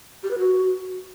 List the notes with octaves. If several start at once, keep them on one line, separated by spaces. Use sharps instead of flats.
G4
B4
F#4